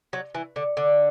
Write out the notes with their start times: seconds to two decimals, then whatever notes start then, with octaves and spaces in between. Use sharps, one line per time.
0.13 F#3
0.35 E3
0.56 D3
0.77 D3